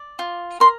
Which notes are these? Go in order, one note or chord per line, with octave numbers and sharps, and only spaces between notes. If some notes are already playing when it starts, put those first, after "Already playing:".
Already playing: D5
F4
A#4 C6